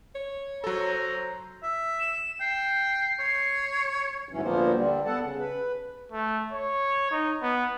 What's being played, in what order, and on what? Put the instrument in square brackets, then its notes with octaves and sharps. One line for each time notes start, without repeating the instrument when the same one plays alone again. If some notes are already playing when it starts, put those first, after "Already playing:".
[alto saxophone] C#5
[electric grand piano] F#3 A4 [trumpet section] C5 A#5
[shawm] E5
[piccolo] E7
[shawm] G5 [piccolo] C7
[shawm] C#5
[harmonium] D#2 G#2 E3 F#3 C#4
D2 A#2 F3 A#3 B3 C5
D3 G3
B3 A4 F#5 A5
C#3
B4
[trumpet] A3
C#5
D#4
B3